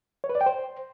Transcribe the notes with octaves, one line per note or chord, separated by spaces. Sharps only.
C#5
B4
D5
G5
C5